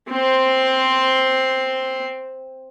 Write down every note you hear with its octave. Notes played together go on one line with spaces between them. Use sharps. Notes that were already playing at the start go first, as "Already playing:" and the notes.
C4 C5